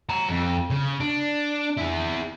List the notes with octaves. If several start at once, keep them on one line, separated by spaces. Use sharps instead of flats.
F#5 A#5
F2
C#3
D4
E4 G#4